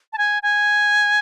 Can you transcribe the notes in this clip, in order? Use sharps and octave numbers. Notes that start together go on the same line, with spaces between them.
A5
G#5
G#5